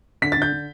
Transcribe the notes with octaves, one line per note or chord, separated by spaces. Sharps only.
D3 B6
A6
D3 G6
D3